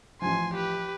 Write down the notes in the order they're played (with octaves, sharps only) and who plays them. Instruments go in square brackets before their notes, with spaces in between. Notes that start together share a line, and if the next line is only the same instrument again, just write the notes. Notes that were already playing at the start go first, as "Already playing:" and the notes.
[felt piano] A1 F3 [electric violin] G#5 C6
[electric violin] G4 B4